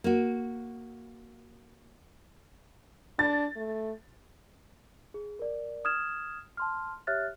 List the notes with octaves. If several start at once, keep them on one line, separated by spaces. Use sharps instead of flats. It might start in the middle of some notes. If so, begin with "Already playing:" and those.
A#3 F#4
D4 A6
A3
G#4
A#4 D5
D#6 F6 G#6 E7
A5 C6 F6
G4 C#5 E5 F6 F#6 A6